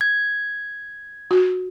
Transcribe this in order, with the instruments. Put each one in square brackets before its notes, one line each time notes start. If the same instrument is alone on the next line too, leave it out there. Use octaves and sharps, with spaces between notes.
[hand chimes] G#6
[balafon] F#4